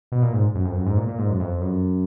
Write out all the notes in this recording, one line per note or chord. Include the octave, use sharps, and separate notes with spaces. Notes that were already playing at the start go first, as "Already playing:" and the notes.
B2
A#2
G#2
F#2
F2
F#2
G#2
A#2
A#2
G#2
F#2
F2
F#2